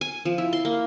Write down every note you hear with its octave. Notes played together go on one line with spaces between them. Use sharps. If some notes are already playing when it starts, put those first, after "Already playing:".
G#5
F3
E4
C6
A#3